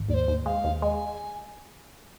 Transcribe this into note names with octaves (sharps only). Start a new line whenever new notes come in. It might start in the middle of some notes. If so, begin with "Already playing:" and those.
Already playing: G#1
D#2 D5
C5
D#2
G#3 F5
D#2
G#3 G#5